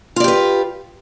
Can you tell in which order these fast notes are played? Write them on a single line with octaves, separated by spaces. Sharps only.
F4 D5 G4 B4